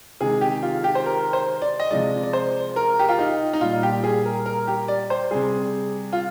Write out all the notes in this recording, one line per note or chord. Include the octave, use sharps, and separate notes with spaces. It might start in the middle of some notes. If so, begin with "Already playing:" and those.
C3 D#3 G#3 G#4
G4
F4
G4
C5
A#4
C5
D5
D#5
C3 F3 G#3 D5
D5
C5
A#4
G4
F4
D#4
D#4
A#2 G3 F4
G4
G#4
A#4
A#4
G4
D5
C5
C3 G3 G#4
F4